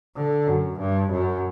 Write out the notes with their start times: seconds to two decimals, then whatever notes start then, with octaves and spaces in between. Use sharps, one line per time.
0.16 D3
0.47 F#2
0.78 G2
1.10 F#2